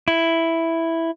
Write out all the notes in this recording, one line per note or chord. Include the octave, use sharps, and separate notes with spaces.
E4